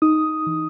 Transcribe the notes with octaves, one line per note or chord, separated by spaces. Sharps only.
D#4 D#6
E3